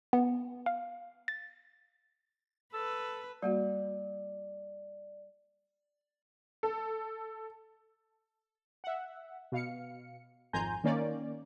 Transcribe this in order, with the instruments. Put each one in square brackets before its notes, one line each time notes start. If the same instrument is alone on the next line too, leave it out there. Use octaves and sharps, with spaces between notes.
[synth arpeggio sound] B3
F5
A6
[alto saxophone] A4 [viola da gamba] B4 [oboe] E6
[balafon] G3 A#3 F#4 [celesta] D5
[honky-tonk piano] A4
[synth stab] E5 F#5
B2 F5 C#7
G#1 F2 G#5 A#5 C6 G6
D#3 A#3 C#4 D5